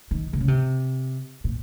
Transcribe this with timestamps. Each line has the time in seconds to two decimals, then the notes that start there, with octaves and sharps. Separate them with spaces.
0.11 D#3
0.33 C3
0.40 C#3
0.48 C3
1.44 A#2